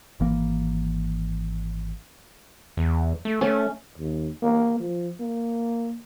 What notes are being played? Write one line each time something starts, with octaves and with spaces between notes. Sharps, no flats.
G#1 E3 A#3
E2
A3
A3 C#4
D#2
A#3
F3
A#3